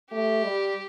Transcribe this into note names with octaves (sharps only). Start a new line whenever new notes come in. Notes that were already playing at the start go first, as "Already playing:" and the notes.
A3 G4
G3